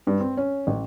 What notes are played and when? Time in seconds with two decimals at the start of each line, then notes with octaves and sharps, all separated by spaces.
0.07 G2
0.20 C4
0.37 C#4
0.67 A1